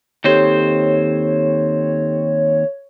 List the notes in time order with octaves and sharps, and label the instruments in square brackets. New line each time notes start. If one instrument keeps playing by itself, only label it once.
[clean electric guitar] D#2 C4 C5 [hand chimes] D#4 G4 A4 [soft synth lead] C#5